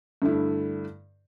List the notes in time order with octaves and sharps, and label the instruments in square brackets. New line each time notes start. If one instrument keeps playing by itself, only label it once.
[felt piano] G2 D3 A3 E4